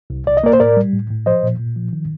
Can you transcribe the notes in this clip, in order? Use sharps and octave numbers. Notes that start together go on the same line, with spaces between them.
C2
C2 D5
D#5
A#3 A#4 D5
C5
A2 A#4 D5
G3
A2
A2
F3 C5 D#5
A#2
A#2
F3
D#3